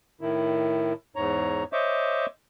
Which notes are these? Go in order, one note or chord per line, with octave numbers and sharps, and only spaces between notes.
A2 D#3 E4
E2 G#2 C#5 A#5
C5 C#5 D#5 E5 C#6 D6